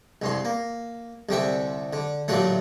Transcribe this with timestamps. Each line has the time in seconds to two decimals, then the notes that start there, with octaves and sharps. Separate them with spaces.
0.22 C2 G2 C6
0.45 A#3
1.29 C2 D3 C4 E5
1.93 D3
2.28 A1 A#2 D3 F#3 A3